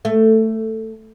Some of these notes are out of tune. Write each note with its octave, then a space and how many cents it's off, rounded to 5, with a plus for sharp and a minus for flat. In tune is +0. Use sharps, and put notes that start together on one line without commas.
A3 +10